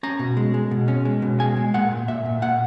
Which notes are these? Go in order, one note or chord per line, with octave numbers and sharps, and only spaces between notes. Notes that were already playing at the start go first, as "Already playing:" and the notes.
C#4 A#5
B2
G#3
G#3
B2
C#4
G#3
B2
G#3 G#5
G#3
A#2 F#5
A#2
A#2 E5
A#2
A#2 F#5